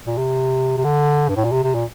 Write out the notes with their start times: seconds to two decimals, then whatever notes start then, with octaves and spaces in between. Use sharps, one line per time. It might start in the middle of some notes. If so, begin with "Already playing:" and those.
0.07 A#2
0.18 C3
0.78 C3
0.84 D3
1.29 G2
1.36 A2
1.45 A#2
1.52 C3
1.63 C3
1.74 A#2